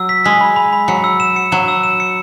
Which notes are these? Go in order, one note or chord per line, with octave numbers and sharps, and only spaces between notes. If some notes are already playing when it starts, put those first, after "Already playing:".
Already playing: F#3 E6
B6
G#3 B6
B5
B5
B5
F#3 C#7
E6
E7
C#7
F#3 E7
E6
E7
C#7